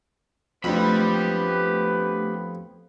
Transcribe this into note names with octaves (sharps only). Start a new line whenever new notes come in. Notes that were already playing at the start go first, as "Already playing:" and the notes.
F2 F3 A3 B3 D4 G4 B4 B5